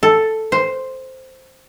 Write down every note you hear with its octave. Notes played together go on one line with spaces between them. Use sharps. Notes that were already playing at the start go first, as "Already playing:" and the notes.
A4
C5